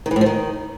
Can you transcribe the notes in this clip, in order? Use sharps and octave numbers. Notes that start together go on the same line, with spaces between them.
D#3
E3
A2
F3
D#3